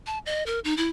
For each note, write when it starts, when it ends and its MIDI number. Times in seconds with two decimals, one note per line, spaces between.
0.07 0.18 81
0.26 0.44 75
0.46 0.60 70
0.64 0.76 63
0.77 0.90 64